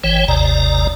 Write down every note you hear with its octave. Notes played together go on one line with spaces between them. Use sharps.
G#1 E3 C#5 G5
G#1 D#2 C3 D5 A#5